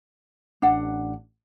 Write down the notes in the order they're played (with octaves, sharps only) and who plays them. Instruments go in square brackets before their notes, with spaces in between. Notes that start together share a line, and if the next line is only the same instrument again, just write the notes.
[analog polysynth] A1 [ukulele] D4 F#5